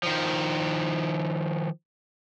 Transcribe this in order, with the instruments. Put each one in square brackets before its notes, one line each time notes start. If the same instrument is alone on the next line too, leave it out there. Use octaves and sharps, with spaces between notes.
[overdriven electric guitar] D#3 F3